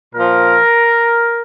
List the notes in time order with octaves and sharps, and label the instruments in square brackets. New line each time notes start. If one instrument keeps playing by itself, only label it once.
[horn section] A#2 F3 A#4